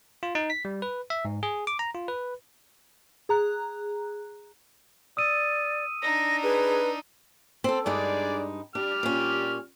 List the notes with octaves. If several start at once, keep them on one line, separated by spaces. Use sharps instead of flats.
F4
D#4
B6
G3
B4
E5
G#2
G#4
D6
A#5
F4
B4
G#4 A#5 F#6
D5 D#6 E6 D#7
D4 D#4 A#6
G#4 B4
C4 A4
G2 G#3 D4 D#4 G#4 D5
G3 D4 G4 F6
A#2 C#4